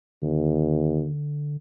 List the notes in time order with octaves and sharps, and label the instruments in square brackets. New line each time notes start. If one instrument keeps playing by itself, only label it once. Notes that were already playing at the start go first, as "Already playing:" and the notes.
[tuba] D#2 [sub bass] D3